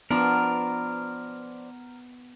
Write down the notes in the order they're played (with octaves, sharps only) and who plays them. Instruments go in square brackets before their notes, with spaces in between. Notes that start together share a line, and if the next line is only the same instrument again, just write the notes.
[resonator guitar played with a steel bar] F3 D4 [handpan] B3 [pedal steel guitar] A#4